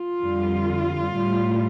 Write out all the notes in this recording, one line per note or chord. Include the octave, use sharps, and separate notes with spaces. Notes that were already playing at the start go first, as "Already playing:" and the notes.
Already playing: F4
F2 D3 G3
A2 G3